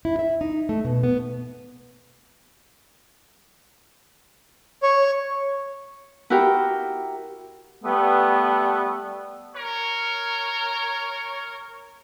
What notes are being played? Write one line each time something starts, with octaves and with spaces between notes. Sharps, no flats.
E4
E5
D#4
A3
B2
B3
C#5
E4 F#4 G4 A#4 G5
G3 A3 B3
A#4 C#5